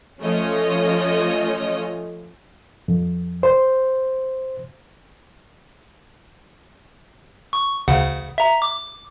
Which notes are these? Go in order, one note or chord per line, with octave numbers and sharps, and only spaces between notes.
F3 A3 C#4 F4 C#5 D#5
F2
C5
C#6
D2 C#3 F#5
E5 A#5
D6